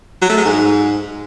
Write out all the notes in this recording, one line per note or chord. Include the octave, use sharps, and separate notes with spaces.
F#3
A3
G#3
G#2